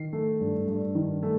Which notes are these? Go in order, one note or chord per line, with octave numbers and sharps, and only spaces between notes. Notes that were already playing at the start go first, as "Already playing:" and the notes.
Already playing: D#3 C7
A3
G2
G2
D#3
A3